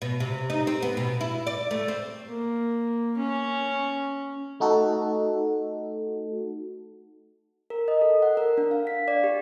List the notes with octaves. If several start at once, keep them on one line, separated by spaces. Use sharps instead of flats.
B2
C3
D#4
C4
B3
B2
E4
D5
A3
C4
A#3
C#4
A3 D#4 F#4 A4
A#4
D#5
A4
F#5
A#4
D4
F5
B6
D5
G4